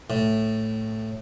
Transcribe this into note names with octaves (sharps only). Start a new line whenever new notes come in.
A2